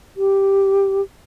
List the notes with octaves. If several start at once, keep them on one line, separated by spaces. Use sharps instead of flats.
G4